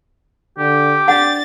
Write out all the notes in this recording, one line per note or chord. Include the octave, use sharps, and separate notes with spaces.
D3 G4
D4 F#5 A6